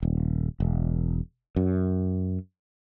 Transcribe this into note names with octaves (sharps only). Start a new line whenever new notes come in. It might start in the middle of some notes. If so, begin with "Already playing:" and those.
D#1
E1
F#2